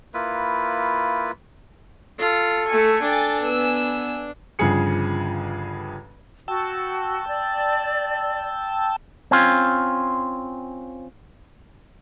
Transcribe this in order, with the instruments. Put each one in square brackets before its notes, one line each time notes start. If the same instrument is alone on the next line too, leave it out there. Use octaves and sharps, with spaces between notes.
[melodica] A#3 E4 F4 B4
[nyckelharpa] F4 [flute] A4
[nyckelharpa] A3 G#5 [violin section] C#6
[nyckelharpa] D4 [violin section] G5 G#5 A6
[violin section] B3 G#5 E6
[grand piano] G1 G2 C#3 F3 G#4 C#7
[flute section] F#4 [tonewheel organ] G5 A5 E6
[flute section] D5
[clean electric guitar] C4 C#4 F4